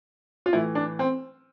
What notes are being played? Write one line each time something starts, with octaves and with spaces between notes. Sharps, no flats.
F4
A2 E3 E4
D4
C4